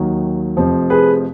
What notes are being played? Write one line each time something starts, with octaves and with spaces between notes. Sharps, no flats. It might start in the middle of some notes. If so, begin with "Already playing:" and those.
Already playing: D#2 D#3 F#3
F1 F2 F3
G#4 B4